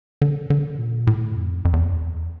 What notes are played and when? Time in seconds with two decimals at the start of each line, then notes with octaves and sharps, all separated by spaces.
0.22 D3
0.50 D3
0.79 A#2
1.07 A2
1.36 F2
1.65 F2
1.73 E2
1.81 F2
1.93 E2